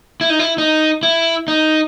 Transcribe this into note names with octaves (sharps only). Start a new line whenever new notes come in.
E4
D#4
E4
D#4
E4
D#4